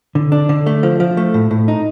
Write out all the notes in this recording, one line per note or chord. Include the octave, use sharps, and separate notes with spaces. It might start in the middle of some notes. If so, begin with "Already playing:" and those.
D3
D4
D3
A3
F3
F3
A3
A2
A2
D#4